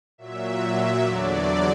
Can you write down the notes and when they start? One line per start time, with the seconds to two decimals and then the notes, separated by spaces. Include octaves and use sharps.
0.18 A#2 F#3 E5
0.60 E5
1.02 E2 D3 F#3 D5